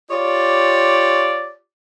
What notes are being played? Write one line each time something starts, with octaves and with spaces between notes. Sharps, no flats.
F4 G4 C#5 D5